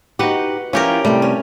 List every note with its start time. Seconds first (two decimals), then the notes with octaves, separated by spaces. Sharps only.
0.19 D#4 F#4 G4 B4 F#5
0.73 F3 C#4 E4 F4 G4 A#4
1.05 C3 G3 A3
1.22 C#4